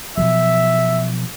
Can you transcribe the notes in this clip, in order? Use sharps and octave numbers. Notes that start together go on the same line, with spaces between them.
B2 F3 F#3 E5